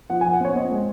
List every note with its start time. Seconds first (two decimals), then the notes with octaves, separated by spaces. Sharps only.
0.10 F3 F#5
0.21 G#5
0.25 F3
0.33 F#5
0.40 C4 C#5
0.55 C4 D#5
0.71 G#3